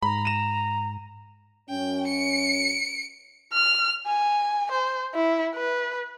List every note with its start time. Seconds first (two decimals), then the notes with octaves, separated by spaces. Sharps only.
0.03 G#2 A#5 B5
0.25 D#7 E7
1.70 F#2 C#4 G5
2.07 C#7 D7
3.53 F6
4.07 G#5
4.72 C5
5.15 E4
5.55 B4